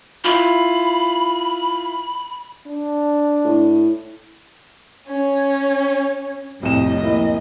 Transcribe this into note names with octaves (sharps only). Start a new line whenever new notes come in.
E4 F4 B5
D4
A2
C#4
C2 F2 A2 G3 D#5 E7
A#3 E4